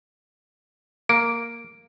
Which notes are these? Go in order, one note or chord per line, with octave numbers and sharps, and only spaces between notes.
A#3 D7